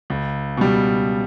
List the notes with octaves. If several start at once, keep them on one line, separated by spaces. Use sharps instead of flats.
C#2
B2 G3